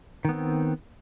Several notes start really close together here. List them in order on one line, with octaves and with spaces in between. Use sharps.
D#3 B3 C4